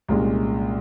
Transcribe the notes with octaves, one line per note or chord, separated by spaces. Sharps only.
C2 A#2 G#3 C#4